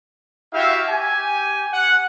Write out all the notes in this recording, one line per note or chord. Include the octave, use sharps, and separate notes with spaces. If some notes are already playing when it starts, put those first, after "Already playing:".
E4 F#4 G4 E5 F5
G4 G#5
F#5